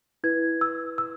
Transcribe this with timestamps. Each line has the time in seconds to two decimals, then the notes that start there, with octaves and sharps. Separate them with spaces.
0.24 E4 B4 G#6
0.61 E6
0.98 E6